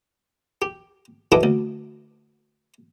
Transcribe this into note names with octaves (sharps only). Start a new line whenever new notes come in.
G4
E3 E4 F#4 A4 D#5 D6
D2